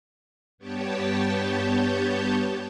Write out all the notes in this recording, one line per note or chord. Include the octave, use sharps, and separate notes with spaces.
G2 B3 G4 C#5 G5 A5